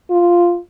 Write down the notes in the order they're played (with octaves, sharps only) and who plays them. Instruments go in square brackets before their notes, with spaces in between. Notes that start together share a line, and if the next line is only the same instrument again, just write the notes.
[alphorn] F4